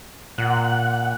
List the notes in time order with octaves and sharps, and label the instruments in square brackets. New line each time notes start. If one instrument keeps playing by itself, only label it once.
[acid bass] A#2 [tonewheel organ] F#5